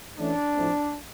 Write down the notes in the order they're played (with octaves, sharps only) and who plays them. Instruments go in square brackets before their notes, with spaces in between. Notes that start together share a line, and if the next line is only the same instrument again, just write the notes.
[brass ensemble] E3 A3 C#4 D4
A2 F3 A3 C4